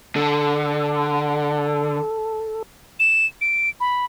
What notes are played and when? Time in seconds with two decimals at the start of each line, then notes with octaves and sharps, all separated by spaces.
0.16 D3 A4
3.00 E7
3.41 D7
3.80 B5